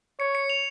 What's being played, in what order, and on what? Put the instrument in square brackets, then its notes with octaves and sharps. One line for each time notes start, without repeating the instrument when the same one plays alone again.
[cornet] C#5 [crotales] C#7
[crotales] C#7
F7